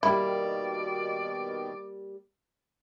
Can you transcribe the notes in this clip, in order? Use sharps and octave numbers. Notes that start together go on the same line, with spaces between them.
B2 D#3 G3 A#3 E4 G4 D5